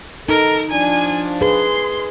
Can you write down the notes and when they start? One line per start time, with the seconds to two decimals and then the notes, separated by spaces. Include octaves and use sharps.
0.29 D#4 A4 A#4
0.71 F3 D4 G#5
1.41 G#4 B4 C6